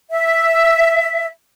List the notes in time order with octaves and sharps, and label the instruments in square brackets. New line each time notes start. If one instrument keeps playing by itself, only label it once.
[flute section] E5